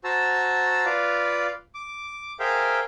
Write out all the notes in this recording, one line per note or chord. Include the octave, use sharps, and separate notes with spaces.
F#4 C5 A5 A#5 E6
F4 B4 D5 F5
D6
G#4 A#4 C5 E5 F5 G5